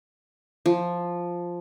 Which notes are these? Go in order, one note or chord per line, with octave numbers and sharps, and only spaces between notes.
F3